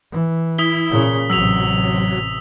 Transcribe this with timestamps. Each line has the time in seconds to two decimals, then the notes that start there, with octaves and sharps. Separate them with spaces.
0.12 E3
0.58 E4 D#6 B6 G7
0.90 A#2 C#3
1.30 A1 C3 F#3 E6 B6 F7